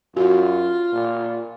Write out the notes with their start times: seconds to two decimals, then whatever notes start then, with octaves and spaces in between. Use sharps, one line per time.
0.17 F#2 F4 F#4
0.93 A#2